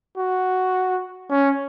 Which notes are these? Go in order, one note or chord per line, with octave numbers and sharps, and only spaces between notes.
F#4
C#4